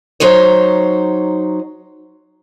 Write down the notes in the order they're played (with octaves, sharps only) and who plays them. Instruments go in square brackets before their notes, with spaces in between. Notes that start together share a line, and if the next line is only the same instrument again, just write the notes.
[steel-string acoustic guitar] F#3 D#4 C5 C#5